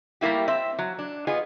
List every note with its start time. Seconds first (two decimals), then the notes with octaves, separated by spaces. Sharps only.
0.21 G3 A3 A#3 E4 G4
0.48 C4 E5
0.79 F#3
0.99 D4
1.27 B3 F4 G#4 D#5